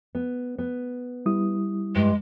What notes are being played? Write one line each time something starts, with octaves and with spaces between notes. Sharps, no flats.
B3
B3
G3 E4 D#6
G2 G#3